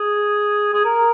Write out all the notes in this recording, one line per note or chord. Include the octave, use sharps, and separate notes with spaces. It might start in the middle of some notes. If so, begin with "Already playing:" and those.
Already playing: G#4
G#4
A#4